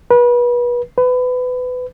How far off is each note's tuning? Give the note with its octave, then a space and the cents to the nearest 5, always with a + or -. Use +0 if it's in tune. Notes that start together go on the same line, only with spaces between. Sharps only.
B4 -30
B4 +25